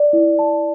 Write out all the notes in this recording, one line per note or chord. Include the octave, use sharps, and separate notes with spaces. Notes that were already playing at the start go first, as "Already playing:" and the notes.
Already playing: D5
E4
A5